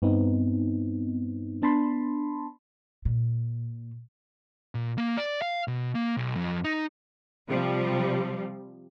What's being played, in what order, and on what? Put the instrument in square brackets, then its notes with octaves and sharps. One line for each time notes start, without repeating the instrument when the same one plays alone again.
[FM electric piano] G2 B3 C4 D#4
B3 D4 A5 B5 C6
[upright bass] A#2
[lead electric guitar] A#2
A#3
D5
F5
B2
A#3
B1
F2
D#4
[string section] C3 F3 G3